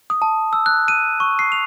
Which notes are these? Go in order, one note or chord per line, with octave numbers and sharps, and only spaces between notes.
D#6
A5
E6
F#6
D#7
C#6
C7
F7